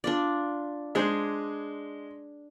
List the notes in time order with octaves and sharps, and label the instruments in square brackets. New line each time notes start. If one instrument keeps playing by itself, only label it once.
[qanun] D4 F4 D5
[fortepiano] G#3 C5 [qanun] D4 G#4